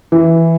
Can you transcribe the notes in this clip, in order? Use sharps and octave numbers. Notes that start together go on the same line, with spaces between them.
E3